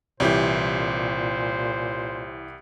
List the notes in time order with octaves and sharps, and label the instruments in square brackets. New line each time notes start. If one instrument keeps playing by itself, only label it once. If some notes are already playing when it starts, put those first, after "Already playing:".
[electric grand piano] C2 G4 G6 [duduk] A#2 [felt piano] E3 E4 C#5 [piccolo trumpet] C5